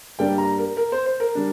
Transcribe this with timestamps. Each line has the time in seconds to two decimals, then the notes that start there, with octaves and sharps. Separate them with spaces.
0.19 G2 G3 A#3 D4 G5
0.38 A#5
0.58 A#4
0.77 A#4
0.92 C5
1.06 C5
1.20 A#4
1.35 G3 D4